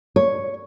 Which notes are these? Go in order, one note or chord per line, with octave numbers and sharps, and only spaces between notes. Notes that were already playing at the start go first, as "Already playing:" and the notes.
C#5